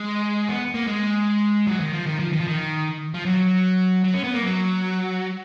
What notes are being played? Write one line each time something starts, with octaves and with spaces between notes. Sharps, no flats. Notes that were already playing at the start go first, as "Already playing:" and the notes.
Already playing: G#3
B3
A#3
G#3
F#3
D#3
F3
D#3
F3
D#3
F3
D#3
F3
F#3
F#3
C#4
B3
A#3
F#3